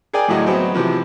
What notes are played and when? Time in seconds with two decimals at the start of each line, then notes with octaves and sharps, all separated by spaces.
0.13 G#4 A#4 D5 G5 G#5
0.28 D2 A2 F#3 D#5
0.47 F#3 B3 C4
0.74 C3 E3 F3